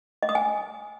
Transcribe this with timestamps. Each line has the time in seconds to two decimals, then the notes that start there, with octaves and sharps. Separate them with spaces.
0.23 D#5
0.29 D#6
0.35 G#5